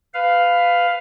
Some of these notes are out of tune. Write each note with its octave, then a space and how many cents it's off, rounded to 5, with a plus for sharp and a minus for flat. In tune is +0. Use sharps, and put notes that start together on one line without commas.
B4 +20 F5 +0